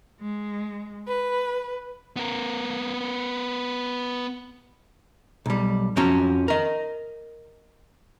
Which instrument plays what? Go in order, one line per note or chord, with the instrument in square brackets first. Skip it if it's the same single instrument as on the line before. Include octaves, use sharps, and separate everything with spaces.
[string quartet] G#3
B4
[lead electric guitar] B3 A#4
[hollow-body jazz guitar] B1 G3
F2 F3 C#4 F#4 A#5
A#4 D#5